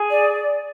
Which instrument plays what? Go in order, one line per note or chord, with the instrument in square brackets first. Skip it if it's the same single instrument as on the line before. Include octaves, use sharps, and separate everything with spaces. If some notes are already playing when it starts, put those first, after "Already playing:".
Already playing: [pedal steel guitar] G#4
[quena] D5